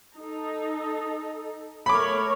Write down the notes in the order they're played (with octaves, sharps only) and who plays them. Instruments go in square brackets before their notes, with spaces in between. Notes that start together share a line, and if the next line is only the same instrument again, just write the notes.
[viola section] D#4 A4
[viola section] A3 A#4 C#5 [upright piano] B5 D6